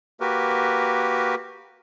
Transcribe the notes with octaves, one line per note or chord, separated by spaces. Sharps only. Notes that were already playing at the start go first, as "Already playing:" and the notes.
A#3 F#4 G4 A#4 B4